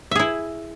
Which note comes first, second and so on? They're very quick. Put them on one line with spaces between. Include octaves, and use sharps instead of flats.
E5 G#4 E4